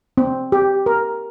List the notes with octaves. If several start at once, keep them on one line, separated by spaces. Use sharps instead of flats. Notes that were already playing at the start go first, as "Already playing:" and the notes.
C4
G4
A#4